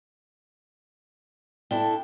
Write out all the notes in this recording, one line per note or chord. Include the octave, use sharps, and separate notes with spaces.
D4 E4 A4 G5